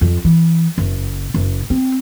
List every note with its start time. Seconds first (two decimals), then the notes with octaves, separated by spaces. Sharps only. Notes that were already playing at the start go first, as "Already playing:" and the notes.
0.01 F2
0.25 E3
0.78 F#1
1.34 F#1
1.70 C4